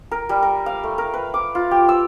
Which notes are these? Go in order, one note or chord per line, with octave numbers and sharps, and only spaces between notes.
A#4
G3
A#4
F5
A3
A#4
B4
D6
F4
G4
E6